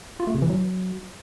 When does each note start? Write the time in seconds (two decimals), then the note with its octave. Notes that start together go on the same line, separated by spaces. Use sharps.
0.20 F4
0.27 A3
0.35 C3
0.42 E3
0.50 F#3